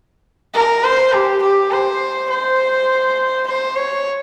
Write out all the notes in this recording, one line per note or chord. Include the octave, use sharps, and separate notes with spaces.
A#4
C5
G4
G4
C5
C5
C5
C#5